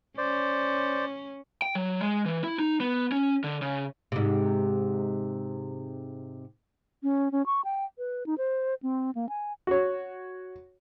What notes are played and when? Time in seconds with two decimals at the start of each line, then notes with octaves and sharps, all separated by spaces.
0.18 C#4 C5 D5
1.62 G5
1.75 F#3
2.01 G#3
2.26 E3
2.44 E4
2.59 D#4
2.80 B3
3.12 C#4
3.44 D3
3.62 C#3
4.12 G#2 C3
7.03 C#4
7.32 C#4
7.46 C#6
7.65 G5
7.98 B4
8.26 D#4
8.38 C5
8.83 C4
9.15 A#3
9.29 G#5
9.67 F#4 C#5